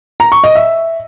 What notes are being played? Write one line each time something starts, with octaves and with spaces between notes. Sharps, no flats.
A#5
C#6
D#5
E5